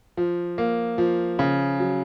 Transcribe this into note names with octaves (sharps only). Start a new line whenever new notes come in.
F3
A#3
F3
C#3
F#3